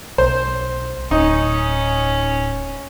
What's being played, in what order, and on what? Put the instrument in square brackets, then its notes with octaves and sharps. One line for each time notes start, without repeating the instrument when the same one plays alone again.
[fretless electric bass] B1 [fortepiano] C5
[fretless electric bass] D1 [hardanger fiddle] C#4 [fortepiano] D#4